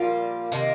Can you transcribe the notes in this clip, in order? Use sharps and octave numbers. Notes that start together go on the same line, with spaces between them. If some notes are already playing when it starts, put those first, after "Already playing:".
Already playing: A#2 F3 G3 A#3 F4
C3 D#3 A#3